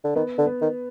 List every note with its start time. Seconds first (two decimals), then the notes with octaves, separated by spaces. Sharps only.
0.04 D3
0.15 D#3 B3
0.38 D3
0.46 B3
0.61 D#3